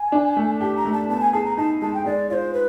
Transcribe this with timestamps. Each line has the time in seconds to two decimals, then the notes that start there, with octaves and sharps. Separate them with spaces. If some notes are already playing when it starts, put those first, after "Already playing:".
Already playing: G#5
0.12 D4
0.37 A3
0.60 G4 A5
0.77 A#5
0.85 A3
0.93 A5
1.09 B3 A5
1.21 G#5
1.33 G#4 A5
1.45 A#5
1.57 D#4 A5
1.82 G#3 A5
1.94 G5
2.06 G#3 D5
2.30 F4 C5 D5
2.54 B4